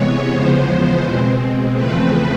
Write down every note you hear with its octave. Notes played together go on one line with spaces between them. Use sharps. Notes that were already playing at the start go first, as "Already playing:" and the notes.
Already playing: C3 E3 G#3 B3 C#5
E2 C#3 F3 G#3 B3 C5
B2 G#3 C4
E2 C#3 F3 A3 C4 B4